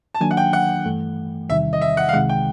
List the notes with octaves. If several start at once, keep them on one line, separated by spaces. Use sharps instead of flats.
A5
D#3 F#3 A#3 D4 G#5
F#5
G5
F#5
G2 E3 A3
E2 C3 D#3 G3 E5
D#5
E5
F#5
F5
C2 C3 D#3 G#3 F#5
G5